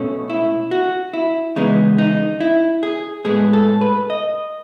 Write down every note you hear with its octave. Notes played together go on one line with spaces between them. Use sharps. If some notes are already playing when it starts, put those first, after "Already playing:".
Already playing: B2 A3 C#4
E4
F#4
E4
E2 C#3 G#3 B3 D#4
D#4
E4
G#4
A2 G#3 B3 G#4
A4
B4
D#5